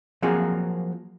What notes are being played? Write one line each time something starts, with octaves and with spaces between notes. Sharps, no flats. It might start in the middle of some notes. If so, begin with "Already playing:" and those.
F3 F#3 A#3 C4 G#4